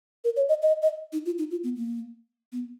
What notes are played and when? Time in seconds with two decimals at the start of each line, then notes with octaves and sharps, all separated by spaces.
0.24 A#4
0.36 C#5
0.49 D#5
0.62 D#5
0.82 D#5
1.13 D#4
1.26 F4
1.38 D#4
1.51 F4
1.64 B3
1.76 A#3
2.52 B3